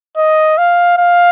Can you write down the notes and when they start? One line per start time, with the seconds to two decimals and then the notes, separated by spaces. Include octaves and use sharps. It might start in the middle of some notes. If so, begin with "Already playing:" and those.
0.17 D#5
0.58 F5
0.98 F5